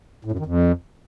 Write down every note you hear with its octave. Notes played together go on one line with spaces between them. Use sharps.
A2
F#2
D#3
F2